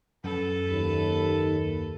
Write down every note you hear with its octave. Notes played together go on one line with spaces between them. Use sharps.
F#2 A4 B4
D#2